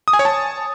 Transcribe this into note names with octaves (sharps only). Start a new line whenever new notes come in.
D#6
G#5
C#5
A5